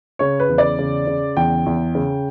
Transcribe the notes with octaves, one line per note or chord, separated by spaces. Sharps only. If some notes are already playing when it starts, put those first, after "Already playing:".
C#3 C#5
B4
E2
D5
C#3
C#3
E2 G5
E2
C#3